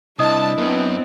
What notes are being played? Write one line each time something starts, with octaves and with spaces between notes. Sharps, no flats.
C2 D4 E4 D#5 A5 D#6
F#2 B3 C4